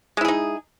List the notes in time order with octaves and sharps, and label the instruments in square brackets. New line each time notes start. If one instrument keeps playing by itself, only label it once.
[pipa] G#3
E4
G#4
D#4